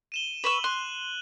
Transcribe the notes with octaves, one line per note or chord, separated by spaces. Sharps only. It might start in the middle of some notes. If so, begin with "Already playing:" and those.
D#7 E7 G7
B4 C#6 E6 F#7
C6 F#6